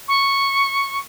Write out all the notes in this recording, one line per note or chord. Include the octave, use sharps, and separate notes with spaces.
C#6